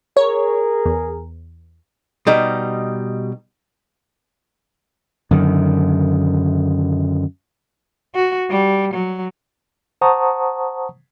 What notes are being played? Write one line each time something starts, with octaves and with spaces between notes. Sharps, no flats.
G#4 A#4 C#5
E2
B2 G3 D#4
F#2 D3 D#3
F#4
G3
F#3
C5 F#5 A5 A#5 C#6 D#6